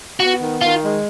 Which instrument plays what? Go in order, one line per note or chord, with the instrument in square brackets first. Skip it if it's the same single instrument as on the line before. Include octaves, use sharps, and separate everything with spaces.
[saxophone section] B3 [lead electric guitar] F#4
[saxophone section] D#3
[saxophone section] D#3 [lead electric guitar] F4
[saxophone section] G#3